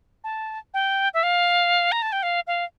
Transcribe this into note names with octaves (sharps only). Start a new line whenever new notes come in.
A5
G5
E5
F5
A#5
A5
G5
F5
F5